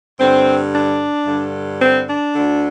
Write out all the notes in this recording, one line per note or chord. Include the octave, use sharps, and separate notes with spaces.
G2 D3 C4
D4
G2 D3
C4
D4
D2 D3